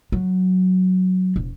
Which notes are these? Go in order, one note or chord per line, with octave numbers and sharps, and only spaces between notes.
F#3
E1